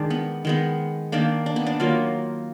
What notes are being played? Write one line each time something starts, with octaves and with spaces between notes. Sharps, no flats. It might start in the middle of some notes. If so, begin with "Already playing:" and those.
Already playing: D#3 G#3 D4
B3
D#3 G#3 B3
D#3 A#3 D4
D4
B3
D4
D#3 F#3 A#3 F4